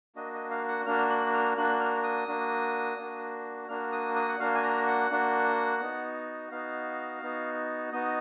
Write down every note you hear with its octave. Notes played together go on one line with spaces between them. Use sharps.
A#3 D4 F#4 D#5
D#5
F5
F#5
A#3 D4 F#4 F6
F#6
F6
A#3 D4 F#4 F#6
F6
D#6
A#3 D4 F#4
A#3 D4 F#4
A#3 D4 F#4 F6
D#6
D#6
F#5
A#3 D4 F#4 F5
G#5
A#5
F#5
A#3 D4 F#4
B3 D#4 F#4
B3 D#4 F#4 F5
B3 D#4 F#4
B3 D#4 F#4 D#5